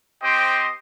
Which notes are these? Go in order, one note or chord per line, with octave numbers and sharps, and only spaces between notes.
C4 G4 C5 D#5 G5